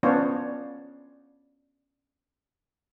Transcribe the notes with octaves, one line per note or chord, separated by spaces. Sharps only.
B3 C#4 D4 F4 C5 C#5